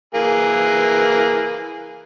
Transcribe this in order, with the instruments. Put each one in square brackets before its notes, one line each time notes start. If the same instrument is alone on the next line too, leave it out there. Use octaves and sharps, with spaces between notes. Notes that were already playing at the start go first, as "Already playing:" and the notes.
[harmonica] E3 A#3 G#4